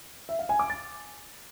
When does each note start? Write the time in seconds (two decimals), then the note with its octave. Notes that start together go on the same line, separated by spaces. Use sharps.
0.29 E5
0.39 F5
0.49 G#5
0.59 D6
0.70 A6